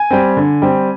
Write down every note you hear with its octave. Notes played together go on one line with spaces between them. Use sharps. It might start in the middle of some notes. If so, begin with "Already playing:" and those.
Already playing: G#5
G3 C4
D3
G3 C4